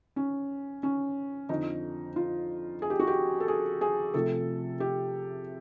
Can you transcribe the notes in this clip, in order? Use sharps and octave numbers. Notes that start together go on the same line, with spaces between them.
C#4
C#4
F2 D3 F3 D#4
F4
G#4
G4
F#4
G4
A4
G#4
G#4
C3 F3 A3 A4
G4